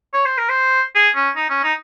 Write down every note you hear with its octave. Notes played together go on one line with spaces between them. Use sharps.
C#5
C5
A#4
C5
G#4
C#4
D#4
C#4
D#4